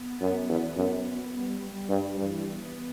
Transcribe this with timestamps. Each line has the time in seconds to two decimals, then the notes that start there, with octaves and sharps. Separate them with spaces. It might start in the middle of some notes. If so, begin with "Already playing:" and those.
Already playing: B3
0.21 F#2
0.49 E2
0.77 F#2
1.33 G3
1.89 G2 G3
2.17 G2 E3
2.45 B3